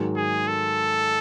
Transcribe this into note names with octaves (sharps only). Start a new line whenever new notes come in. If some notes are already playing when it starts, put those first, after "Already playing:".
Already playing: G#2 D#3 F#3
G#4
A4